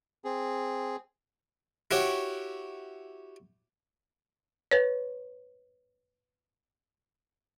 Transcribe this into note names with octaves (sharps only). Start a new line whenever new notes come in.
C4 G#4
E4 F#4 G4 C#5
B4 C#5